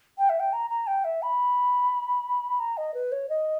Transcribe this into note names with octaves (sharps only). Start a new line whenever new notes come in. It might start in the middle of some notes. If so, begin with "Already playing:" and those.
G5
E5
G5
A#5
A#5
G5
E5
B5
A#5
D#5
B4
C#5
D#5